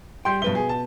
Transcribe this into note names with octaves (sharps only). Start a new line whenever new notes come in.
G3 G5 C6 G6
G2 B2 B4 E5 G7
G#4
A5